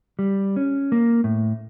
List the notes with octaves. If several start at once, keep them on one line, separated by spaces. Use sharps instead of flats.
G3
C#4
A#3
A2